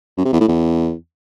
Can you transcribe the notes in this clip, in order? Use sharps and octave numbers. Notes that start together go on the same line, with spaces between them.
F#2
C3
E2
A2
E2